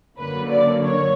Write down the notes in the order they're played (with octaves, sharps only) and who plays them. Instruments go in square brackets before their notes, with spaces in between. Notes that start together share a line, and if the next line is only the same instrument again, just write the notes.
[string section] F#2 D3 F#3 A#3 B4
D5
C#5